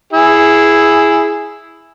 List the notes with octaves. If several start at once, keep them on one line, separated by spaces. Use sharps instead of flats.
E4 G#4